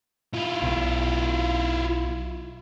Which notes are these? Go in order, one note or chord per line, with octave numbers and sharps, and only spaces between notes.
E4 F4
B1